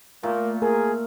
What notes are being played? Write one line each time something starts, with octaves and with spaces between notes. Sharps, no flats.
A#2 A3 A#3
G#4 A#4